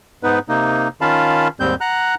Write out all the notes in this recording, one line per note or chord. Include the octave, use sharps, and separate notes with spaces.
G#2 B3 D#4 B4
C3 A#3 D#4
D#3 C#4 F4 F5 A5 B5
D#2 G#2 G3 C4 G6
F#5 A#5 F#6